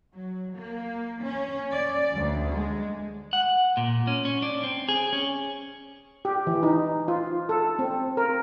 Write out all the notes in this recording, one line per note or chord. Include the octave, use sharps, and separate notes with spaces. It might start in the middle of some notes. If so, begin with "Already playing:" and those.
F#3
A#3
C#4
D5
D2
G#3
F#5
A#2
C#4
C#4
D4
C4
G#4
C#4
G4
E3
D#4
F4
A4
C4
A#4